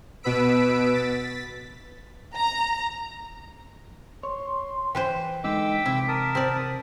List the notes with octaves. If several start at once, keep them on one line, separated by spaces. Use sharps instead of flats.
B2 B3 B4 E6 B6 D7
A6 B6
A#5
C#5 C6
E3 B4 C5 G5
D3 G#3 D#4 G5 D6 E6 B6
C3 E4
A#4 A5 D#6
C4 D5